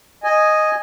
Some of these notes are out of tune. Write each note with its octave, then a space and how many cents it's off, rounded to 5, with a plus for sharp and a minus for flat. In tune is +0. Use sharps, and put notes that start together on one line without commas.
D#5 -5 G#5 +0